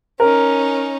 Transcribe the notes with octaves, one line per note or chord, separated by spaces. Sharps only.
C#4 D#4 A#4